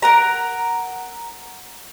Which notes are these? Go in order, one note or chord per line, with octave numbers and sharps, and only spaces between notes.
A#4 F#5 A#5